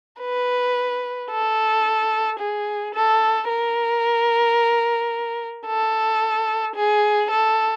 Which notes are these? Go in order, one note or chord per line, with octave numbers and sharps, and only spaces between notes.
B4
A4
G#4
A4
A#4
A4
G#4
A4